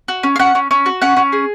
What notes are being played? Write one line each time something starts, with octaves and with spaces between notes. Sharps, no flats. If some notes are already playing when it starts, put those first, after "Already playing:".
F#4
C#4
F5
C#4 F#5
C#4
C#4
F#4
C#4 F#5
C#4
G#4